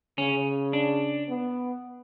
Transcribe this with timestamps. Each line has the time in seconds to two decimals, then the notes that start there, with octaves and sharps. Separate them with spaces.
0.18 C#3 C#4
0.73 D4
1.29 B3